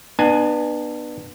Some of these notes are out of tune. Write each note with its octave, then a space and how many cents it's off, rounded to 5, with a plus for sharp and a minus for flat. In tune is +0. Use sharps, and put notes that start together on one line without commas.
B3 -10 D4 +35 G#5 +10